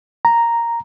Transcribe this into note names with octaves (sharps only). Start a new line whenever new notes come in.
A#5